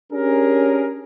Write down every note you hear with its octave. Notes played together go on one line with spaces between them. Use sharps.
C#4 D4 G4 G#4 A#4